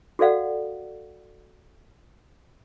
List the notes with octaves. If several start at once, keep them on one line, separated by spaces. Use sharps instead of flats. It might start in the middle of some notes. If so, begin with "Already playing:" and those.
F#4 A4 D5 F5 F#5